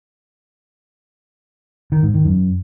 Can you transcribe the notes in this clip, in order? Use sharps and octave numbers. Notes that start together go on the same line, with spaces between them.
D#3
G#2
D#3
F#2